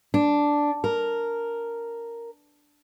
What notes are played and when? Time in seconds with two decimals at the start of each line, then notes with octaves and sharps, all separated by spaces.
0.14 D4
0.84 A#4